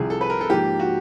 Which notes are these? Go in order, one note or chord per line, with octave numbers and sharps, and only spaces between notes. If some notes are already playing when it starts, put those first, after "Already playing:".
Already playing: C2 C3 F3 G#4
A4
B4
A#4
A4
G#2 F3 A#3 G4
F#4